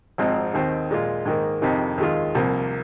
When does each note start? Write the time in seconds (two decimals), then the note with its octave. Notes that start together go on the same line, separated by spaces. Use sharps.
0.18 G#1 G#2 F3 C4 D#4
0.54 D#2 D#3 C4
0.91 A#2 G#3 F4
1.26 G#2 D#3 A#3
1.62 F2 C3 D#3 C4 D#4
1.98 D#2 D#3 G#3 F4
2.35 C2 C3 F3 A#3